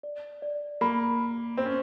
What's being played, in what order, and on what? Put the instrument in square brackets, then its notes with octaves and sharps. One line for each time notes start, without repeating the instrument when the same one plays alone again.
[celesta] D5
D5
[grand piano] A#3 [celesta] B5
[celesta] B5
[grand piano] C4 [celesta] C5
[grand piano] C#4